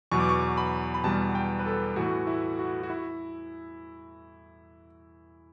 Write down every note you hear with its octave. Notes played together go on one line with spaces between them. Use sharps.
E2 B2 F#3 C#6
D6
C#6
B5
B5
E2 B2 G3 B3 A5
G5
B4
A4
A2 E3 A3 F#4
E4
F#4
F#4
E4